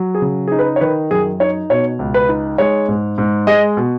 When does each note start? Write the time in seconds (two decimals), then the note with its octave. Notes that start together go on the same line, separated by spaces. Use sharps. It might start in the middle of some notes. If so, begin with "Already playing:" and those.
Already playing: F#3
0.15 G#4
0.22 C#3
0.48 D#4 G#4
0.59 B4
0.76 C#5
0.81 D#3 B4
1.11 F#2 G#4
1.40 D#4 C#5
1.70 B2 C#5
1.99 C#2
2.14 B4
2.29 D#4
2.58 G#3 C#5
2.88 G#2
3.18 G#2
3.47 G#3 D#5
3.77 B2